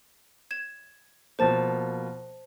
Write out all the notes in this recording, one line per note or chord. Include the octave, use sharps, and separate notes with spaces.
G#6 E7
B2 F3 A#3 C5 A5 A6